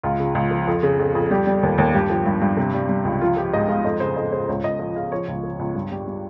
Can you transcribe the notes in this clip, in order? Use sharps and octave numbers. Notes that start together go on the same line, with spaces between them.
C#2 F4
C#3
C#2
F3
F2
C#3
F2
F2
G3 G4
G3
D#2
D#2
G2 G4
F3
G2
G2
C3
G3
G3
C#2
F3 F4
F3 G4
G#2 D#5
G#2 F5
F2 D#5
C#3 C5
F2 D#5
C#3 C5
C#2 C#5
C#2 D#5
F3 D#5
C#3 F5
F3 C#5
C#2
F3
C#2
G2
G3
G3